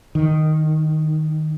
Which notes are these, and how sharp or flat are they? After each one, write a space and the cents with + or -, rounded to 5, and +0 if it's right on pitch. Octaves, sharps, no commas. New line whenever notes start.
D#3 -5